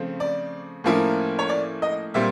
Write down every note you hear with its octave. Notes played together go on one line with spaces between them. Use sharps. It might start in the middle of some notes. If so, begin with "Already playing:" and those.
Already playing: C#3 F3 A3 C4
D5
A2 F3 A#3 C#4 E4
C#5
D5
D#5
A#2 G3 C4 E5